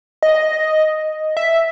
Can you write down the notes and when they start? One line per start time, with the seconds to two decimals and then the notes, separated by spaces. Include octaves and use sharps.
0.23 D#5
1.37 E5